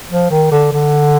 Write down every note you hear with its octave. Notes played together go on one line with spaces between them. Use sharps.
F3
D#3
D3
D3